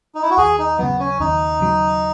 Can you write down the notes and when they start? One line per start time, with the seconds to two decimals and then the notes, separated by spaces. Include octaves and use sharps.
0.15 D#4
0.22 E4
0.30 F#4
0.37 D#2 G#4
0.59 D#4
0.78 C#3 F#3 B3
1.00 C#4
1.20 D#2 D#4
1.60 C#3 F#3